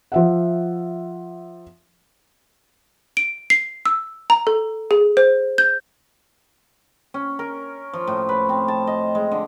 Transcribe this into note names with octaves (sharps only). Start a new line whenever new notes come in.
F3 E5 F#5
D7
C7
E6
A#5
A4
G#4
C5
G6
C#4
A#4
F3
A2
B4
C4
A5
D#5
G#3
D3